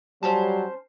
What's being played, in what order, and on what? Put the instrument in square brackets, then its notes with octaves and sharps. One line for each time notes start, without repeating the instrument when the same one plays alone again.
[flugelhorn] F#3 [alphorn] G3 [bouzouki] C#4 C5 A5